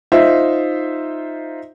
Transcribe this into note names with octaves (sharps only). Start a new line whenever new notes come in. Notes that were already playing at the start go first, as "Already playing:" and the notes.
D#4 F4 C5 E5